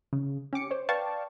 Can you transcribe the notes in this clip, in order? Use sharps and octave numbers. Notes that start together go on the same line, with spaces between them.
C#3
C#4 G4 D6 C#7
C5 C#5
B4 D5 F5 G5 A5 C#6